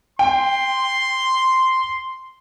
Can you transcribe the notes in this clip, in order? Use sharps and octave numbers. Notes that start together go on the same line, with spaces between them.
G5 C6